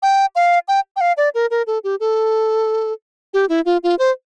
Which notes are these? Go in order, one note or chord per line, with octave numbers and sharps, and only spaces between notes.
G5
F5
G5
G5
F5
D5
A#4
A#4
A4
G4
A4
G4
E4
F4
F4
C5